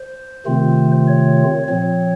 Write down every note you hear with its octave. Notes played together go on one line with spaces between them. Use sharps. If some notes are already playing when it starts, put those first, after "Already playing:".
Already playing: C5
C3 D#3 A3 C4 F4
C#5
A#2 F3 C4 C#5